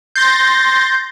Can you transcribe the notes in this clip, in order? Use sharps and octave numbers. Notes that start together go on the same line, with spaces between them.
C6 G6 A6 A#6